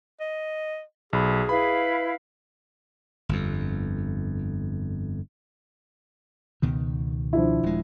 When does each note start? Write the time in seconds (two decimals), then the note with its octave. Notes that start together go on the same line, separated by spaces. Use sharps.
0.20 D#5
1.13 B1 G#4 B5
1.49 E4 B4 F5 B5
3.29 G1 F2
6.62 C#2 B2 D#3
7.33 F3 D4 E4
7.63 D#1 G#3